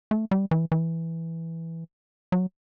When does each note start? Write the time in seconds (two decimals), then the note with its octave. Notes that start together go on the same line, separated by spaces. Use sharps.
0.11 A3
0.31 G3
0.51 E3
0.72 E3
2.32 F#3